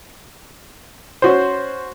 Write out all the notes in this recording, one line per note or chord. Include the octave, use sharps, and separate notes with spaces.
C#4 F#4 C5